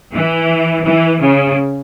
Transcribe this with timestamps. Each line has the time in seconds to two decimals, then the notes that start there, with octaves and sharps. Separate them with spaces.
0.14 E3
0.84 E3
1.19 C#3